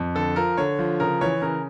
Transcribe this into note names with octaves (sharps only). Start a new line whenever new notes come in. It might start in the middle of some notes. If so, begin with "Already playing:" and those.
Already playing: F2
D3 A4
F3 A#4
D3 C#5
F3
C#3 A#4
E3 C#5
C#3 A#4